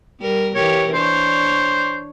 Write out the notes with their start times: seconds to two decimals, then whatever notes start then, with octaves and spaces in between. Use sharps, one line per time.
0.20 G3 A#4
0.55 E3 G4 A#4 C#5
0.94 D4 C5 C#5